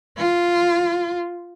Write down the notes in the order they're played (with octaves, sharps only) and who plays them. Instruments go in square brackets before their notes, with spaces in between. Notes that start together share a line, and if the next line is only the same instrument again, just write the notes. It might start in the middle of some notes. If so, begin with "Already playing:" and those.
[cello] F4